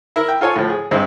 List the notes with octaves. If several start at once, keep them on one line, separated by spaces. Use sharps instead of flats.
E4 A#4
G5
F4 A4 C#5 G#5
A2 F3
G#4
G2 G#3 C4 E4